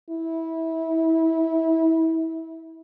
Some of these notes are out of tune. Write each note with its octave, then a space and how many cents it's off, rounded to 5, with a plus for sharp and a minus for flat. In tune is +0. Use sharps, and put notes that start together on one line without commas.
E4 -25